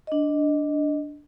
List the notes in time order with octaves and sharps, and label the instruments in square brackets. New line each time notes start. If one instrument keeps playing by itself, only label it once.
[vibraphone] D4 D#5